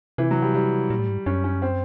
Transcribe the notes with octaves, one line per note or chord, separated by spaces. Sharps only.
C3 E3
F#3
G3
G3
A#2
A2
G#2
F#2 C#4
C#4
C4